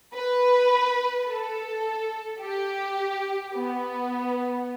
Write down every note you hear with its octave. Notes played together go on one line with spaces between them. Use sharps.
B4
A4
G4
B3